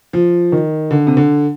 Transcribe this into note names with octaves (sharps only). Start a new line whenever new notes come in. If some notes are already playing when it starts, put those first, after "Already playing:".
F3
D#3
D3
C3
D3